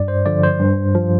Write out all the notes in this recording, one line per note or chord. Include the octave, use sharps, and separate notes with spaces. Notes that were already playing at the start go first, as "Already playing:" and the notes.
Already playing: G2 D5
C5
D3 F3 D5
C5
G2
F3